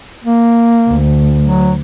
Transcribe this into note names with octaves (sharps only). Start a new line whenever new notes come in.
A#3
D2
F#3